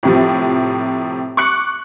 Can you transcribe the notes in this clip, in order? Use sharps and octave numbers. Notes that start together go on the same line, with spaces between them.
A2 C3 F3
C#6 D6 F#6 C#7